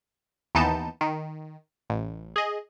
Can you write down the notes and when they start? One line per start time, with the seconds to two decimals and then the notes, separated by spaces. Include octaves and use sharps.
0.55 D#2 E3 B3 D#4 A5 G6
1.01 D#3
1.90 A1
2.36 G#4 D#5